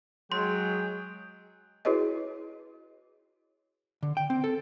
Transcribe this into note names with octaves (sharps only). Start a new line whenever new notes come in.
F#3 G#3 G#4 G5 C6
E4 F#4 G#4 B4 C#5 D#5
D3
G5
C4
A4